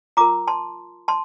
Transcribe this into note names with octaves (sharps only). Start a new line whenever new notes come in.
F4 A#4 A#5 D6
A5 C6
A5 C6